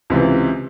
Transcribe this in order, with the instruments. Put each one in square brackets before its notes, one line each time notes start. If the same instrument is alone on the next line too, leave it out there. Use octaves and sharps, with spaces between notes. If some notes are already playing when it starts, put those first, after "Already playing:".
[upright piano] C#2 C3 E3